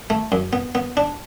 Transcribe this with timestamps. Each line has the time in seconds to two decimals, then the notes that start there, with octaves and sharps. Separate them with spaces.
0.10 A3
0.32 F#2
0.53 B3
0.75 B3
0.97 D4